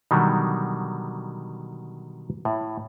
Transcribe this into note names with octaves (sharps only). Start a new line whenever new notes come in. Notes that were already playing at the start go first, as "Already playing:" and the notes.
B2 D3 D#3 F#3 G3
A2